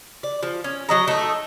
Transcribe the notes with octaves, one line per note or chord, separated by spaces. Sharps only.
D5
F3
C#4
F#3 D#5 A#5
A3 D#4